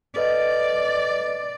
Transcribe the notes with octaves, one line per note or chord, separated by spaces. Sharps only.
A4 B4 D5 D#5